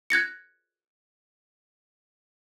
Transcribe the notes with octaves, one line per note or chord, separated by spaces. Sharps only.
F#6 G#6 A#6 C#7